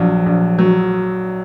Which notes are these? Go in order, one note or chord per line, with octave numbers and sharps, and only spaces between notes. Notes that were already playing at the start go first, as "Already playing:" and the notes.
Already playing: A#1 F3 F#3
A#1
F#3